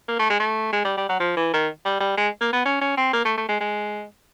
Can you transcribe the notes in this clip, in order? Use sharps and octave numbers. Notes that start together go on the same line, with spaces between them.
A#3
A3
G#3
A3
G#3
G3
G3
F#3
F3
E3
D#3
G3
G3
G#3
A#3
B3
C#4
C#4
C4
A#3
A3
A3
G#3
G#3